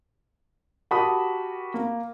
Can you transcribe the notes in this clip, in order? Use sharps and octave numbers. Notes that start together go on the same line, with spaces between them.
F#4 G4 A#4 A5 B5 D#6
A#3